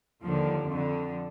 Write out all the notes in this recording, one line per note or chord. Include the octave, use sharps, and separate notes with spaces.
D#2 D3 F3
F2 D3